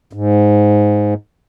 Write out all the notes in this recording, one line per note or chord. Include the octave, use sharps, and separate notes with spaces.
G#2